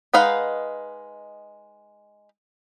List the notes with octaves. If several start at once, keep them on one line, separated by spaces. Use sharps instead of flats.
G#3 D#4 B4 F5 F#5